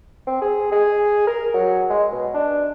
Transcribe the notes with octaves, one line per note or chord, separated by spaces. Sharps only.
C4
G#4
G#4
A#4
F#3
G#3
B2
D4